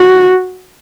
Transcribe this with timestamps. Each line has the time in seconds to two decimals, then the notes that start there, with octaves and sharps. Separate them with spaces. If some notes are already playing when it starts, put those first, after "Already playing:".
Already playing: F#4